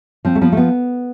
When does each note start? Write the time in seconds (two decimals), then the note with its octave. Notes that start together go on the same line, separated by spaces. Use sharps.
0.25 F3 C4
0.35 A3
0.41 F3 B3
0.52 A3
0.57 B3